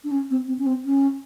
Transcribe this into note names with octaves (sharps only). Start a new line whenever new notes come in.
D4
C#4
C4
C4
C#4
C4
C#4